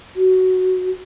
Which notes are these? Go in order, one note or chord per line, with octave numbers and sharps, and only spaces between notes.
F#4